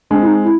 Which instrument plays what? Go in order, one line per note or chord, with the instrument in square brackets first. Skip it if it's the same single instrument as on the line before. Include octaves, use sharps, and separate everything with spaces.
[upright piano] G#3 C4 [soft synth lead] D4
[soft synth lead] E4
D#4
E4